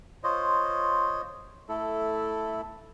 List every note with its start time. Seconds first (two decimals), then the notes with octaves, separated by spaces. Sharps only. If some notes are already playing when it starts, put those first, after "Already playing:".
0.24 F4 C5 C#5 D#5
1.69 A3 E4 A4